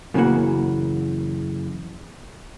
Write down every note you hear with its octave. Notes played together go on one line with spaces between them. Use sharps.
F#2 A#2 C#3 E3 A#3 F#5